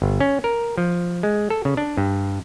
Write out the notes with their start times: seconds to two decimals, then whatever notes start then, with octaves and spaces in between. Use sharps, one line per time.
0.02 G1
0.20 C#4
0.44 A#4
0.78 F3
1.23 G#3
1.50 A4
1.65 C#3
1.77 D4
1.98 G2